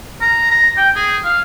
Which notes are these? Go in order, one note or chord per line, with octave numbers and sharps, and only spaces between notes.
A#5
A#5
G5
G#4
F5